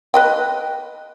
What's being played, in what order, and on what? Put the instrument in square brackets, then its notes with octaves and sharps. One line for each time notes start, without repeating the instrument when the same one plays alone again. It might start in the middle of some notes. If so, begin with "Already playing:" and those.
[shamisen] B4 D#5 G5